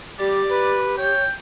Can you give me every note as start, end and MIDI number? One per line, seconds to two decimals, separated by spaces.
0.19 0.42 55
0.19 1.12 67
0.19 0.82 74
0.50 0.93 71
0.98 1.25 73
0.98 1.31 79